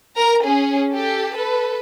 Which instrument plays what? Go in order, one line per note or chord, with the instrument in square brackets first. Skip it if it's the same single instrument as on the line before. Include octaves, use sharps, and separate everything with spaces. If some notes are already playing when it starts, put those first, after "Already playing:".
[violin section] A#4 A#5
C#4 G#4
G4 A4
A4 B4